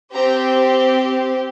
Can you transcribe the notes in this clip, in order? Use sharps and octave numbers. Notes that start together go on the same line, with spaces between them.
C4 G4 A#5